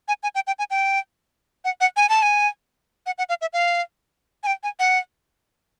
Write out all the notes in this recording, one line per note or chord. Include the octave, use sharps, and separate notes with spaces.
G#5
G#5
G5
G5
G#5
G5
F#5
F#5
G#5
A5
G#5
F#5
F#5
F5
E5
F5
G#5
G5
G#5
F#5